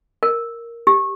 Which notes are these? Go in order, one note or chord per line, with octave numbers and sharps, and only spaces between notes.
A#4
G4